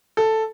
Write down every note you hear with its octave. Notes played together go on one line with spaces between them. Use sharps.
A4